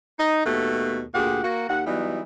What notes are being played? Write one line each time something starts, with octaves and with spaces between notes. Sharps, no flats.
D#4
D#2 B2 A3 A4
D2 A#2 G4 G#4 F#5
A#3 F#4
D#2 F#5
E3 F#3 G3 B3 D#4